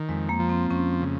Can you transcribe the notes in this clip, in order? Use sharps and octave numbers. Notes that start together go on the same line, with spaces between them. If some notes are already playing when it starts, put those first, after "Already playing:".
Already playing: D#3
F2 G#3
A#3
F3
C4
F2 C#4
C#3